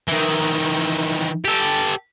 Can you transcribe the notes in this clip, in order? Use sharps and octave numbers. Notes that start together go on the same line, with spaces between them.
D#3 E3
G4 A4